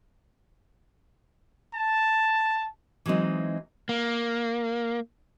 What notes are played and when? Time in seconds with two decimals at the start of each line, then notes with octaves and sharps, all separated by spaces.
1.74 A5
3.06 E3 F#3 G#3 C4 D#4
3.89 A#3